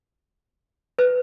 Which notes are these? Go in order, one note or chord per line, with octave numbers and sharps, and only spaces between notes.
B4